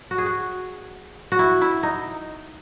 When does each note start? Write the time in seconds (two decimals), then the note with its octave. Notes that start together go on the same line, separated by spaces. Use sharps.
0.11 F#4
0.18 G#4
0.26 F#4
1.32 F#4
1.39 E4
1.61 E4
1.83 D#4